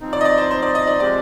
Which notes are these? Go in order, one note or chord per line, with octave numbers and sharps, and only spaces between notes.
F3 C4 D#4
D5
D#5
D5
C5
C5
D5
D#5
D5
F3 G#3 C4 G4 D5